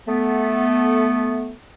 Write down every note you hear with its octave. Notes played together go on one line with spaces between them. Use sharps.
A3 B3